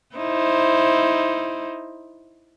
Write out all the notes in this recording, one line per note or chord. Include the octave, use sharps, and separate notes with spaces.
D#4 E4 C5